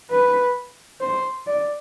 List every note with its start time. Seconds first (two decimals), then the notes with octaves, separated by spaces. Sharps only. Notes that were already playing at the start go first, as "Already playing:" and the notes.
0.11 B4
1.01 C5
1.47 D5